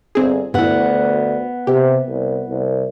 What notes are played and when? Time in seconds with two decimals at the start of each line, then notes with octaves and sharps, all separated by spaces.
0.15 G1 C4 G#4
0.54 D2 G2 E3 B3 F#5
1.67 C3 G4
2.07 C2
2.49 C2